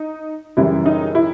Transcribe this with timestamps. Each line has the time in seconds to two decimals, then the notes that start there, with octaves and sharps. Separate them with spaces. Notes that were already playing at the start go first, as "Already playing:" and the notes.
Already playing: D#4
0.57 F#2 C#3 E3 G3 E4
0.86 D#4
1.15 E4